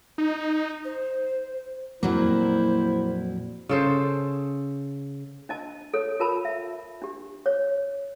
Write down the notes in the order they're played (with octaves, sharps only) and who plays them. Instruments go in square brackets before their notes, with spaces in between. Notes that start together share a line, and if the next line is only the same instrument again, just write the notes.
[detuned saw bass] D#4
[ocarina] C5
[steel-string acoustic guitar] F2 A#2 F#3 [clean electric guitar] A#3 [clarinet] E4 [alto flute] C5
[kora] C#3 A4 C5
[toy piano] D4 D#5 A5
A4 C#5
F4 A#4 A5 B5
E5
D4 G4
C#5